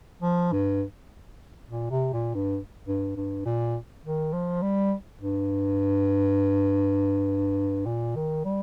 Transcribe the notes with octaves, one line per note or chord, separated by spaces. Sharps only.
F3
G2
A#2
C3
A#2
G2
G2
G2
A#2
D#3
F3
G3
G2
A#2
D#3
G3